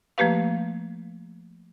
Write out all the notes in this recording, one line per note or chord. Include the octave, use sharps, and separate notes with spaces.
F3 A3 A#3 G4 B4 F5